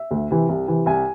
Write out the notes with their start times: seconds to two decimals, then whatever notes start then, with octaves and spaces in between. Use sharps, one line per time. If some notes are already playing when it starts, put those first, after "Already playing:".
Already playing: E5
0.11 D2
0.31 C3 E3
0.49 C2
0.68 C3 E3
0.86 C2 G#5